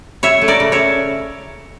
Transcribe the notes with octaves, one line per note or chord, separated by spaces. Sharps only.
C#3 C#5 E5
A3
A#4 D5
C#3
C#5 E5